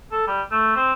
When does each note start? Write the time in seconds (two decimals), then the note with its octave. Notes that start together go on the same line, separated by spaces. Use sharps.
0.12 A4
0.27 G3
0.51 A3
0.76 C4